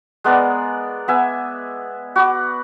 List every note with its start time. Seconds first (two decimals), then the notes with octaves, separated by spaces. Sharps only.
0.24 G#3 B3 A#4 D5
1.08 B3 E5 G#5
2.16 F#4 B5 D6